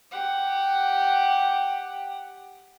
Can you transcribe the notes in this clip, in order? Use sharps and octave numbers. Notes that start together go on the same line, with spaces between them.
G4 F#5